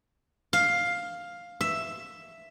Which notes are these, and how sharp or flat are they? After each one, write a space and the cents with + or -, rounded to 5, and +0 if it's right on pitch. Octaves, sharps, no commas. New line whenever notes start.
F5 +5
E5 +5